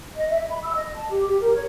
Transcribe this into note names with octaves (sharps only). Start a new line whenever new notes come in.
D#5
E5
B5
E6
D#5
A5
G4
G4
A#4
C#5